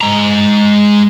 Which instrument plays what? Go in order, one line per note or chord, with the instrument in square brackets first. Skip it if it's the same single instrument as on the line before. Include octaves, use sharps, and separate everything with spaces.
[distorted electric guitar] G#3 A#5